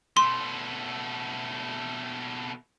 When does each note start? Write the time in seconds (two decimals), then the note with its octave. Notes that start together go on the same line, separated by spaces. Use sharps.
0.17 B2 A3 C6